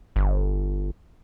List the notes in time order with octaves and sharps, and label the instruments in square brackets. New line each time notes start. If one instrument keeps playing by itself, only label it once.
[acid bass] G1